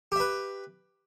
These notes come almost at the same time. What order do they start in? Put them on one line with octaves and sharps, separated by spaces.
G4 E5 B4